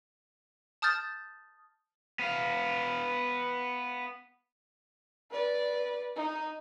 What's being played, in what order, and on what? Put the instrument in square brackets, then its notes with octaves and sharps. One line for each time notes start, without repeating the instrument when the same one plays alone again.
[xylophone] A5 D#6 F6 G6 A6
[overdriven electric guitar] B3 F5
[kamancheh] B4 D5
D#4